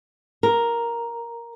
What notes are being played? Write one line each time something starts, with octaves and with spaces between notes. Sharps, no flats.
A#4